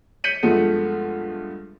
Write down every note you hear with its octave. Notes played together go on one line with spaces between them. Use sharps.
G6 B6 C#7 D#7 F#7
G2 F3 G#3 A3 B3